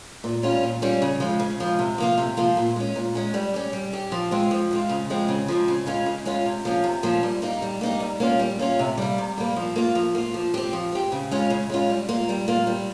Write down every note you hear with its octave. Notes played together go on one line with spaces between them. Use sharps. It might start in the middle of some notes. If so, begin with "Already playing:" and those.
A#2
G3 C#4 F4
A#2
G3 C#4 F4
C#3
F3 G#3
C#3
F3 G#3
C3
F3 A#3 F4
C3
F3 A#3 F4
A#2
G#3 C#4
A#2
G#3 C#4
G3
C#4 G4
G3
C#4 G4
F3
G#3 C4 F4
F3
G#3 C4 F4
C#3
F3 G#3 C4
C#3
F3 G#3 C4
C#3
G#3 C#4 F4
C#3
G#3 C#4 F4
C3
F3 A#3 C#4
C3
F3 A#3 C#4
G3
A#3 D#4 G4
G3
A#3 D#4 G4
G3
A#3 C#4 F4
G3
A#3 C#4 F4
C3
G3 A#3
C3
G3 A#3
F3
A#3 F4
F3
A#3 F4
F3
C4 G4
F3
C4 G4
C#3
G#3 C#4 F4
C#3
G#3 C#4 F4
G3
A#3 F4
G3
A#3 F4
G3